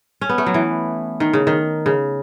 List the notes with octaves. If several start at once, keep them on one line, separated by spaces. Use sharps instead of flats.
C#4
B3
A3
F#3
E3
D#3
C#3
D#3
C#3